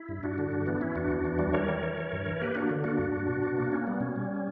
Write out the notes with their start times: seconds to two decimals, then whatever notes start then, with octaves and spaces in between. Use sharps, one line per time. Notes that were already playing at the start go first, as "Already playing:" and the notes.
Already playing: E4
0.09 G2
0.23 G2 D4 F#4
0.38 D3
0.51 G2
0.66 E3 B3 D4
0.81 E3 C#4 E4
0.95 E2 D4 F#4
1.10 E2
1.24 E3
1.39 G3
1.53 G3 A#4 C#5
1.68 E3
1.82 E3
1.97 E3
2.13 G2
2.26 E3
2.36 C#5
2.42 A#3 G4 B4
2.55 A#3 D4 F#4
2.71 D3
2.84 A#3 D4 F#4
2.99 G2
3.13 G2
3.28 B2
3.43 B2
3.57 A#3
3.72 A#3 C#4
3.87 G3 B3
4.00 B2 C#4
4.16 G3